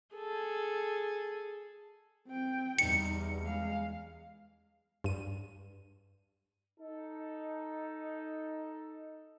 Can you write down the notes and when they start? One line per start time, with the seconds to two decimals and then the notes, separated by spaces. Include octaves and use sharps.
0.15 G#4 A4
2.28 C4 G5
2.79 E2 G3 D#4 C#7
3.43 G#3 F5
5.04 G2 D#7
6.80 D#4 A4